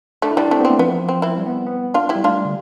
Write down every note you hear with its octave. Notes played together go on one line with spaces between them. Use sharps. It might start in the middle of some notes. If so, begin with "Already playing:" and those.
A3 D4
E4
G3 D4
A3 C4
B3
C4
A3
F3 B3
C4
C4 E4
G3
B3
B3
D4 F4
E4 G4
G3
A3 D4 F4
G3
D3